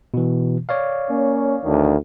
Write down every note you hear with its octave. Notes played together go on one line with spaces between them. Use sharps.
B2 E3
C#5 D5 F5
A#3 C#4
D2 D3 D#3